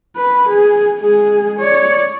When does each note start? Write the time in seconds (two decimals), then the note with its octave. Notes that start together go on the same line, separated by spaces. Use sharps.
0.16 B4
0.49 G#4
1.00 G#3 G#4
1.59 C#5 D5